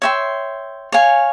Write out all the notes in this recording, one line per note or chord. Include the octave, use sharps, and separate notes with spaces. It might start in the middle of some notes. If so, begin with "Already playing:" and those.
C#5 E5 G5 C6
C#5 F5 G#5